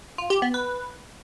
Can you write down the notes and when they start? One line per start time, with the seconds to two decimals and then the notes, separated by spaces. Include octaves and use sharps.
0.18 F4
0.30 G4
0.42 B3
0.54 B4